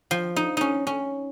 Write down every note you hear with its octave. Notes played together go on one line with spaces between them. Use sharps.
F3
D#4
C#4 D#4
C#4